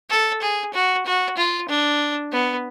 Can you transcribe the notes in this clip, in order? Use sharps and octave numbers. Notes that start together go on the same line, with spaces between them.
A4
G#4
F#4
F#4
F4
D4
B3